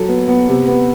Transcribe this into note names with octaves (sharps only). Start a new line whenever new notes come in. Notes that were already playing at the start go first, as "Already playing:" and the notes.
Already playing: F#3 A4
B3
B3
C3
B3